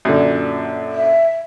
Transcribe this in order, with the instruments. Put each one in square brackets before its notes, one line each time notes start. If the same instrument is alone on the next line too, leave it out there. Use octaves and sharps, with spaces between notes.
[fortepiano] F#2 A#2 D3
[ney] E5